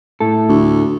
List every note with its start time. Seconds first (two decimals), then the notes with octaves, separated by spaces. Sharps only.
0.20 A2 E4 A4
0.49 D2